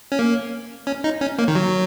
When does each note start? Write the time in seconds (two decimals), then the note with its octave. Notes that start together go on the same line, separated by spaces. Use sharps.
0.12 C#4
0.19 A#3
0.87 C#4
1.04 D#4
1.21 C#4
1.39 A#3
1.48 D#3
1.55 F#3